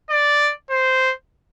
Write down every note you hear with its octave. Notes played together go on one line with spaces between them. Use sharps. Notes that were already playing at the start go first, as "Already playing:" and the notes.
D5
C5